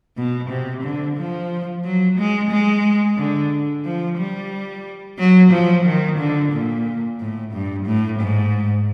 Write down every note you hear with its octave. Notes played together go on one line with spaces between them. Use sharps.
B2
C3
D3
F3
F#3
G#3
G#3
D3
F3
G3
F#3
F3
D#3
D3
A#2
A2
G2
A2
G#2